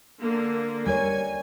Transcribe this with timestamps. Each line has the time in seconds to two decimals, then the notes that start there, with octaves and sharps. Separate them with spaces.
0.21 D3 A#3
0.87 G3 A#4 C#5 G#5